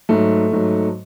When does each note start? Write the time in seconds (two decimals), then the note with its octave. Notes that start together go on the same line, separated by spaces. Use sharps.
0.09 G#2 F#3 A3
0.53 G#2 F#3